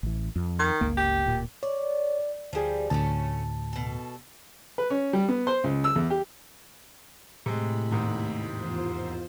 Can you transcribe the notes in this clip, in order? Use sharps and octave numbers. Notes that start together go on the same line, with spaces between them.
A1 E3
F2
D#3
G1 C#2 A#3
G4
D1 A#2
C#5 D5
D2 F3 G3 G#4
D2 A2 A3 C#4 A4 A5
B2 A4
B4
C#4
G3
B3
C5
C#2
E6
E2
G4
A2 C3 G#3 B5
D#2 G#2 C3
E2 F4 C5